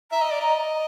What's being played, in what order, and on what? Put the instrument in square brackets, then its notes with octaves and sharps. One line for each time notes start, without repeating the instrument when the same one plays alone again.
[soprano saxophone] E5 [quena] A#5
[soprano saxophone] D#5
D5
D#5